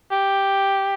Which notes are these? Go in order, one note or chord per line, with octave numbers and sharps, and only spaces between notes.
G4